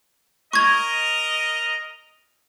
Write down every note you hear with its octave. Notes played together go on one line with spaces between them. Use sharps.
A#4 D#5 A#5 C#6 G#6